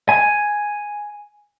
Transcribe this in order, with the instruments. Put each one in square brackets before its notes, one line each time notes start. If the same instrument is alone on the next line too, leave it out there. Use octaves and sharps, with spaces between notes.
[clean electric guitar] G#5